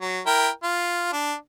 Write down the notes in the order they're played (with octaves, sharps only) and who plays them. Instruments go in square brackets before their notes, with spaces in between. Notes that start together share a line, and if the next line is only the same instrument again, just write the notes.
[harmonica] F#3
E4 A#4 G5
F4
D4